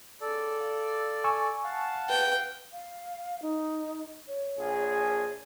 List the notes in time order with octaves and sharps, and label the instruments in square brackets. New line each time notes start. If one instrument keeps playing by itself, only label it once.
[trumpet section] B3 C#4 G#4 [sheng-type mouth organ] A4 D5
[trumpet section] F5
[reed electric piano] G#5 C#6 E6
[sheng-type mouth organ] F5 F#5 [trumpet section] A5
[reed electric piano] B4 [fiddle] G5
[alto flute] F5
D#4
C#5
[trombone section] A#1 G#4